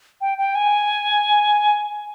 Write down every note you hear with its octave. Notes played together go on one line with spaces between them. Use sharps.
G5
G5
G#5